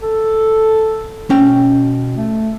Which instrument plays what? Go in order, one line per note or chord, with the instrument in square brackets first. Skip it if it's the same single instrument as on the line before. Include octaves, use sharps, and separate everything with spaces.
[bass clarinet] A4
[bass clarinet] B2 [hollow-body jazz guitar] C#4 G5
[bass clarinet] A3